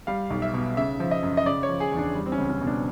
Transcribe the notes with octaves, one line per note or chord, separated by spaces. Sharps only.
G3 F5
B1
E5
B2
C#3 E5
F3
D#5
F#2
D#5
C#3 D5
C#5
F3
G#4
E2
D4
G3
C4
C#4
C#2
C#4
B2
D4